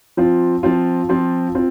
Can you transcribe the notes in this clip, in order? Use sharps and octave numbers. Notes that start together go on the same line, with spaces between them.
F3 C4 F4
F3 C4 F4
F3 C4 F4
C4 F4